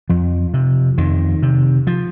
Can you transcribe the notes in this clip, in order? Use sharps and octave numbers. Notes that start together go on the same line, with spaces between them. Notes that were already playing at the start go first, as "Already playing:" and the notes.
F2 F3
C3
F2 D#3
C3
F3